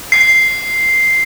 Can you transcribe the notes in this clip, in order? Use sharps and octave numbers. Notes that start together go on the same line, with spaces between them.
C7